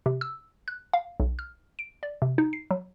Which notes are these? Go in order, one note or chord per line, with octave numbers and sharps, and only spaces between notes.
C3
E6
F#6
F5
B1
F6
D7
D5
C3
D#4
C7
F#3